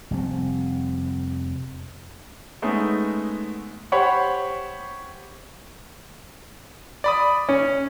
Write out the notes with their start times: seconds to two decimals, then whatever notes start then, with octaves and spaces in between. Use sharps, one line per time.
0.11 F1 G3 C4
2.62 G#3 A3 B3 C#4 D#4
3.92 G4 C5 C#5 F#5 B5 C#6
7.04 D5 B5 D#6
7.49 C#4